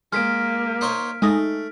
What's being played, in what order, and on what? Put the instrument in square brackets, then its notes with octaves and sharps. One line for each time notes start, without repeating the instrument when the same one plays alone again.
[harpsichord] G#3 [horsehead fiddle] A#3 [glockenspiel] F6 B6 D7
[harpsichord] D#4 C5 C#5
[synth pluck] G#3 D#4 [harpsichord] A3